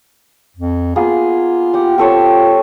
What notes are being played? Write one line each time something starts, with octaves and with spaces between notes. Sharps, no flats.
F2
A#3 B3 F4 G#4
G4 F#5
C4 F4 A4 C#5